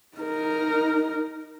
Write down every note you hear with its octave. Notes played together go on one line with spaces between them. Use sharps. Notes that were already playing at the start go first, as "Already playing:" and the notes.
D#4 A#4